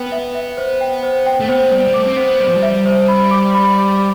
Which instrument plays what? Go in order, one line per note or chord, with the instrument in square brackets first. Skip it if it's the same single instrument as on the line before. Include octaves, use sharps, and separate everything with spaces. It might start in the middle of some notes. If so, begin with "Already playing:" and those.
Already playing: [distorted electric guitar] B3 [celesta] B4 G5
[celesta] E5
E5
C5
G5
C5
G5
[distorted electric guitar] A3
[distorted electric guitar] B3 [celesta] C5
[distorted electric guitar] G3 [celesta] C5
[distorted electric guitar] G3
[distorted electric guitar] A3 [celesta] D6
[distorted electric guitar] C4
[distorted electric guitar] B3 [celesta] C5
[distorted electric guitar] G3 [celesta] C5
[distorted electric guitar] F3
G3
[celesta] E5
C5
B5
D6
B5
D6